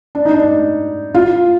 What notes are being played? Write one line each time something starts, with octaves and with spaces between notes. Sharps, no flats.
D4
D#4
D4
F4